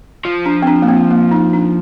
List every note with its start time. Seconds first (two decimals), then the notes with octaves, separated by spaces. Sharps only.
0.25 F3
0.46 D4
0.62 C4
0.67 D4
0.82 A#3
0.88 C4
1.10 A#3
1.31 D#4
1.53 D4